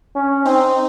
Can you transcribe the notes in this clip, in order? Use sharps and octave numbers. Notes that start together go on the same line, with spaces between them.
C#4
C4 D#4